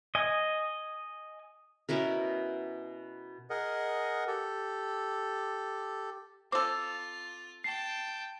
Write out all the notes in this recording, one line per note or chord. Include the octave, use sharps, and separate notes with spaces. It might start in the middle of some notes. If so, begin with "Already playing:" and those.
D#5 G#5
B2 C#4 E4 A#4
G#4 A#4 D#5 F#5
G4 A4
C4 F4 A4 D6
G5 A5 C7